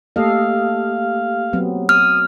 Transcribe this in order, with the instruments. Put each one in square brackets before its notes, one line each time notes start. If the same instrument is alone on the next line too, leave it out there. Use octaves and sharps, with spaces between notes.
[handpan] A3 A4 D#5 [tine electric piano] A#3 G4 [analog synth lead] F5
[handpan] F#3 B3 C4
[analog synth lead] D#6 [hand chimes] F6